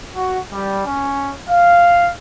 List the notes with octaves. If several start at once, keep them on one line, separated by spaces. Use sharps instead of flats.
F#4
G3
C#4
F5